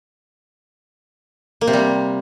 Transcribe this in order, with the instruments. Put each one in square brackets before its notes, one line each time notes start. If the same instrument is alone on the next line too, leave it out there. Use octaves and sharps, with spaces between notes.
[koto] A#3
C3
G3